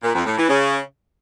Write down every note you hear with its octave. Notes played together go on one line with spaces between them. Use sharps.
A#2
F2
A2
E3
C#3